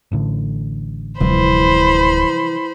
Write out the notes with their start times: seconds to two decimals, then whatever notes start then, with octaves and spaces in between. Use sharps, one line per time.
0.12 A1 A2 D3
1.20 D1 C3 E3 F3 G3 C5 B5